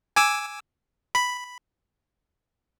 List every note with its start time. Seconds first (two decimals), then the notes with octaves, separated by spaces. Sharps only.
0.16 G#5 D6 E6
1.15 B5